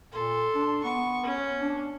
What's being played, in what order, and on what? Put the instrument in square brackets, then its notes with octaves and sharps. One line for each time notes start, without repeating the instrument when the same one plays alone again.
[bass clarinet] A#2 [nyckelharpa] A4 C6
[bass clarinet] D4
[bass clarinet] B3 [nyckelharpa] C#6
[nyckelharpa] C#4
[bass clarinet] D4